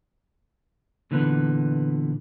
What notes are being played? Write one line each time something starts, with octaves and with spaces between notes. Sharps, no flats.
A#2 D3 E3 B3